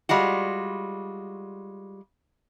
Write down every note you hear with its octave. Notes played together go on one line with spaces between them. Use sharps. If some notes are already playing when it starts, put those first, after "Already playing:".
G3 G#3 F4 F#4